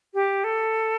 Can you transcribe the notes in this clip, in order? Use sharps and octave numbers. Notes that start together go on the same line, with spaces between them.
G4
A4